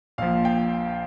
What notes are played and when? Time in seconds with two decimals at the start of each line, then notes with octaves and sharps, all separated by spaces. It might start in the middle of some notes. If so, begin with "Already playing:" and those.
0.18 A#1 A#2 F3 F5
0.45 G5